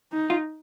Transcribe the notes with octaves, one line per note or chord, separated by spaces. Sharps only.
D#4
F4